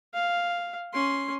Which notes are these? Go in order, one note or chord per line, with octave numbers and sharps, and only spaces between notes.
F5
C#4 C6